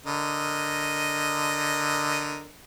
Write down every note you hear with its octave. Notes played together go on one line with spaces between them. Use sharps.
D3 A#4 D#5